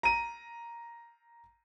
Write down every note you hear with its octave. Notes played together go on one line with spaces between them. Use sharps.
A#5 D#7